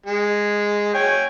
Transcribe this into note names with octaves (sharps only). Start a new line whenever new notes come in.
G#3
C#5 G5 G#5